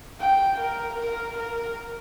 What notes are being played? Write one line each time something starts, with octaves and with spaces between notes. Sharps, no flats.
G5
A#4
A#4
A#4